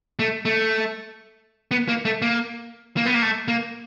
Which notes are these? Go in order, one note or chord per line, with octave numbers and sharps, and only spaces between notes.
A3
A3
B3
A#3
A3
A#3
A#3
B3
A#3
A3
A#3